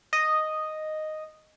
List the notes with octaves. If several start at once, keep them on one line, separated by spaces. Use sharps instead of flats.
D#5